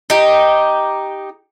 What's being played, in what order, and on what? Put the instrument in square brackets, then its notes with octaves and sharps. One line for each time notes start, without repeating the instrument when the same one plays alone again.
[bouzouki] D#4 G4